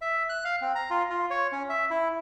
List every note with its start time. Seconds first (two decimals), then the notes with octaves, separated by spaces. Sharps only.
0.01 E5
0.29 F#6
0.45 F5
0.61 C4
0.75 A#5
0.90 F4
1.10 F4
1.30 C#5
1.52 C#4
1.69 E5
1.90 E4